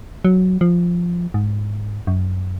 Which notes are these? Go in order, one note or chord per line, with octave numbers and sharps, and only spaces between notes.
F#3
F3
G#2
F#2